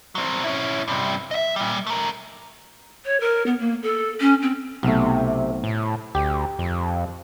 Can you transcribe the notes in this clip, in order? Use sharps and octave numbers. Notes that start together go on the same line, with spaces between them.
F#3 C4
C#4 E4
G2 C3
D#5 E5
A#2 G3
A3 A#4
C#5
A#4
B3
A#3
A4
C#4
C4
B1 C3 A3
A2
D2 G4
F2